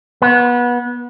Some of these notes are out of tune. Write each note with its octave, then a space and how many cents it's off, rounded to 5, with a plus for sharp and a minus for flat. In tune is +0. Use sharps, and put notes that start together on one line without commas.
B3 -25